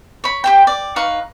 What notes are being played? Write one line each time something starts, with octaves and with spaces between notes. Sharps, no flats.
C#5 B5
G4 C5 G5
D5
D#4 B4 F5 C#6